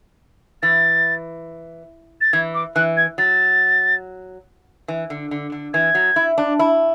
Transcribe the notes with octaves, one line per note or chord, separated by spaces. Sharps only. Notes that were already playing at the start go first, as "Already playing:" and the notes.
E3 A6
A6
E3 G#6
D6
E3 F#6
G#6
F#3 A6
E3
D3
D3
D3
E3 G#6
F#3
E4
D4
E4